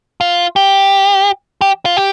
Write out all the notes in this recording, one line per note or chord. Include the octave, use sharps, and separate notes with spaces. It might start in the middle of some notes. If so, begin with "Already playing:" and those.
F4
G4
G4
F4
G4